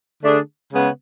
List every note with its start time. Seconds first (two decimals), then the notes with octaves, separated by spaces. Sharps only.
0.23 D3 A3 D4 G#4
0.72 C#3 G#3 B3